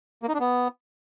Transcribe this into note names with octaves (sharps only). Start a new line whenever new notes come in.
A#3
D#4
D4
B3